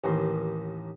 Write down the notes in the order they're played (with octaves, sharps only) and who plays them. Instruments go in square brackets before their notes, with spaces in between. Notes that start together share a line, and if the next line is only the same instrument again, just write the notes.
[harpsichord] A1 D#2 D#3 C6